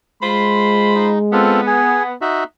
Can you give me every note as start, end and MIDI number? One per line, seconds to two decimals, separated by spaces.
0.23 1.85 56
0.23 1.09 65
0.23 1.09 72
0.23 1.09 83
0.95 1.19 63
1.33 2.13 59
1.33 1.61 60
1.33 1.61 65
1.33 1.61 69
1.67 2.03 68
2.21 2.44 63
2.21 2.44 66
2.21 2.44 76